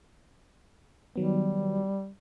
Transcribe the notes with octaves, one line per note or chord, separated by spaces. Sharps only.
D#3 F#3 G3 B3